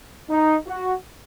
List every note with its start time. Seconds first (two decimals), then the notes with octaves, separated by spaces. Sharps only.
0.29 D#4
0.67 F#4